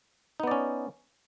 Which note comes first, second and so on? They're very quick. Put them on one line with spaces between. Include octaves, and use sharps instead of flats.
D#4 B3 D5 C#4